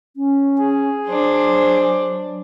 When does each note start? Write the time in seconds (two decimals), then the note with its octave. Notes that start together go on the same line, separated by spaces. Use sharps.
0.17 C#4
0.58 G#4
1.07 F#3 D4 C5